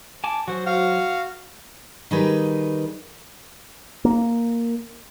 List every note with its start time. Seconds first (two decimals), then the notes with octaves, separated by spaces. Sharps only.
0.24 G#5 A5 D6
0.48 F#3 F#4 C5
0.67 F#4 F5 F6
2.11 D#3 G3 D#4 G#4 B4
4.05 A#3